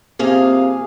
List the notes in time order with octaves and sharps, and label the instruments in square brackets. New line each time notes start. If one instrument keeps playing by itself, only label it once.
[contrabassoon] C3 [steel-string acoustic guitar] F3 A#3 F5 [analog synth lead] G#4